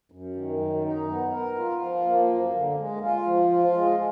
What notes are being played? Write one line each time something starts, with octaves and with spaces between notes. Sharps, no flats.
F#2
D#3
F#2
D#4
B3
A#4
F4
F3
A#3
F#2
D3
G#3
F4
F3
F4
G#3